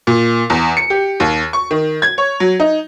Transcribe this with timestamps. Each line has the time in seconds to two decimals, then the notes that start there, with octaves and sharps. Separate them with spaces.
0.07 A#2
0.50 E2
0.77 C#7
0.90 G4
1.20 D#2
1.53 C#6
1.71 D#3
2.02 G#6
2.18 C#5
2.40 F#3
2.60 D#4